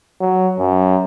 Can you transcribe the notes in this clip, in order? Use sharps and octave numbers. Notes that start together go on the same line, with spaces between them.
F#3
F#2